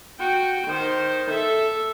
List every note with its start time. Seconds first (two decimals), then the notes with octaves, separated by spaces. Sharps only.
0.20 F#4 G5
0.67 D#3 C5
1.31 A4 E5